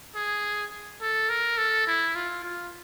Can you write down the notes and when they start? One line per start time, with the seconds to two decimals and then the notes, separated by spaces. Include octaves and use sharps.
0.16 G#4
1.02 A4
1.29 A#4
1.58 A4
1.87 E4
2.15 F4
2.44 F4